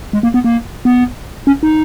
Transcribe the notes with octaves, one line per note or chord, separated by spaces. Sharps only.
G#3
A#3
B3
A#3
B3
C#4
D#4